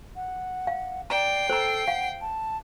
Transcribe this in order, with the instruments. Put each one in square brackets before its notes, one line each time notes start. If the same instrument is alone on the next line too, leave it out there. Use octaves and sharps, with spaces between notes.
[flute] F#5
[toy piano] F5
[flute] D5 [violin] G5 C7 [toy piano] A#5
[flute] A4 [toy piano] C5 A#5
[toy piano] F5 [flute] F#5
[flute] A5